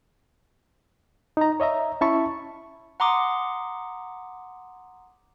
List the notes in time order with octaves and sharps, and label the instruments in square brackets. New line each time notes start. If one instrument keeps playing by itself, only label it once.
[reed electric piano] D#4 A#5
C#5 D#5 E5 A#5
C#4 E4 E5 A5 B5 C#6
[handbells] F#5 A#5 C6 D6 D#6